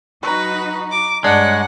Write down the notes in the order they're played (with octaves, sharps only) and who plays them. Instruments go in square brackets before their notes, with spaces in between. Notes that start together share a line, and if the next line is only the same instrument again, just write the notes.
[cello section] F#3 D#4 F#4 [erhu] B4 [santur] A#5 C#6
[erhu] D6
[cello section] G2 C#5 [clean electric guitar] G#3 [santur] D4 [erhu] F#5